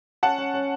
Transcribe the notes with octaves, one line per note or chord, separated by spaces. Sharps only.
C#4 F#5 A5
C#4
C#4